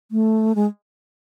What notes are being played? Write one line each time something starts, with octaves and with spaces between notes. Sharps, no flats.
A3
G#3